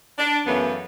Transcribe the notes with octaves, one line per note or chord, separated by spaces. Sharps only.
D4
F#2 C#3 E3 A3 B3